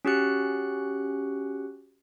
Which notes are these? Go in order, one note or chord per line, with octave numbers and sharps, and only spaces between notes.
C#4 F#4 G4 F#6 C#7